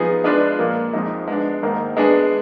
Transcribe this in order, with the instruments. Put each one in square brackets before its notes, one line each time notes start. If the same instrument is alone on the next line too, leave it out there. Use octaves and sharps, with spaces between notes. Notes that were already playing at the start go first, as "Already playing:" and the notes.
Already playing: [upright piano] F3 B3 D#4 G#4
G#3 D4 F4 B4 D5
A#2 F3 A#3
F2 F3 G#3 D#4
G#3 B3 D4
G#2 D#3 A#3 D#4
G#3 B3 D4 G#4